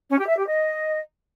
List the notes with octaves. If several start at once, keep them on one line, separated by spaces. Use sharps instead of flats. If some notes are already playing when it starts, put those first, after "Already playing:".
C#4
G4
E5
G4
D#5